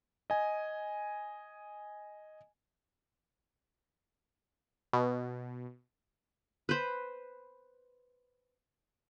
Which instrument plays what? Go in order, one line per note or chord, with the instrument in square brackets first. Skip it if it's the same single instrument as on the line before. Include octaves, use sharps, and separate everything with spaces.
[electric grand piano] D#5 G#5
[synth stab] B2
[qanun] B4 C5